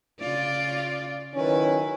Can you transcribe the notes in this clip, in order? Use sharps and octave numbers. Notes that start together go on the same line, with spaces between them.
C#3 F4 D5
D#3 F#3 C#4 E4 B4